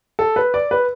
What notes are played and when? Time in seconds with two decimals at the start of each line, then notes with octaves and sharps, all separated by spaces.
0.19 A4
0.36 B4
0.54 D5
0.71 B4